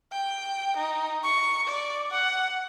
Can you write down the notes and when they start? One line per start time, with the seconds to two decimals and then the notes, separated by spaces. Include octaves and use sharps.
0.12 G5
0.77 D#4
1.23 C#6
1.68 D5
2.12 F#5